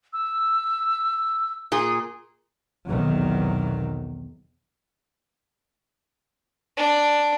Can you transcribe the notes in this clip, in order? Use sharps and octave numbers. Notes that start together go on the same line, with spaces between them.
E6
A#2 G#4
B1 E2 C3 D#3 F#3
D4